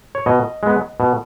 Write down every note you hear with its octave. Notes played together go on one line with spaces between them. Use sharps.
C#5
B2 D#5
G#3 B3
B2